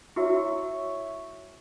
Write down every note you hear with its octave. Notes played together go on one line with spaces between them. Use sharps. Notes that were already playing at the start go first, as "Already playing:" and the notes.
E4 F#4 C#5 E5 C#6